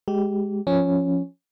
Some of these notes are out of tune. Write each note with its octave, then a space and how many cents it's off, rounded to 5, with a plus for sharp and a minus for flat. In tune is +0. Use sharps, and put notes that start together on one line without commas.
G#3 +0 G4 -20
F3 +0 C#4 +0